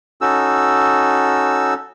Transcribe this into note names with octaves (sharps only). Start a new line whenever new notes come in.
C#4 D#4 F#4 A4 E6